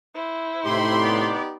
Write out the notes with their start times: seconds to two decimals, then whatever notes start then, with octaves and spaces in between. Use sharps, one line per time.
0.15 E4 C5
0.66 A2 C3 D#4 G4 B5 C6
1.02 B3 D5